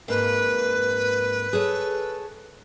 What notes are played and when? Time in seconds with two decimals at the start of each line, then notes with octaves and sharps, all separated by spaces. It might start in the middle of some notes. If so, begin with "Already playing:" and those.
0.08 F2 G#2 A#3 B4
1.53 G#4 A4 C#5